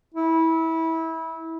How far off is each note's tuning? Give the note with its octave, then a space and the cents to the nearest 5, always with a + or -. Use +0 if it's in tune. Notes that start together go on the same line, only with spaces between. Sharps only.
E4 -25